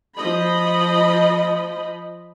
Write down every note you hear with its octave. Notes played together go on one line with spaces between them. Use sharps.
F3 D#5 B5